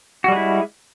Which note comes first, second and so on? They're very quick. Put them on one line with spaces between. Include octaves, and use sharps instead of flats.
F#4 G3 G#3 E4